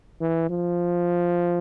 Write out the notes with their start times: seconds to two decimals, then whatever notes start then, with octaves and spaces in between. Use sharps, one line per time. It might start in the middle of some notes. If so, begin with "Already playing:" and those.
0.21 E3
0.50 F3